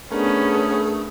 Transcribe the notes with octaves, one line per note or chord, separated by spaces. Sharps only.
A3 B3 C#4 D4 G#4 A#4